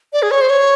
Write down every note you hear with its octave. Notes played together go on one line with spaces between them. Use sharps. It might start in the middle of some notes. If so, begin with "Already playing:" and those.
D5
G#4
C#5
C5
C#5